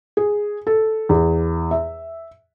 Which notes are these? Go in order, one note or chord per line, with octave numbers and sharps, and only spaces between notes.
G#4
A4
E2
E5